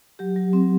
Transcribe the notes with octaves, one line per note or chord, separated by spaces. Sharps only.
F#3 G4
F#3
C4